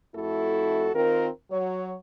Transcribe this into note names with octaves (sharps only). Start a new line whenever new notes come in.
F2 A3 E4 F#4 A4
D#3 C4 F4 A#4
F#3 C#5